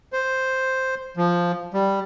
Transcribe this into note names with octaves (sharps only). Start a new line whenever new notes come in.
C5
F3
G3